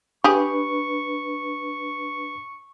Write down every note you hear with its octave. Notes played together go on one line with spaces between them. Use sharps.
D4 G4 G#4 B4 C#6